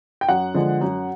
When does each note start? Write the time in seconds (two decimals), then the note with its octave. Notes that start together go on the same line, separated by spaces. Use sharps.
0.21 G5
0.29 F#2 F#5
0.54 D3 F3 G#3
0.81 F#2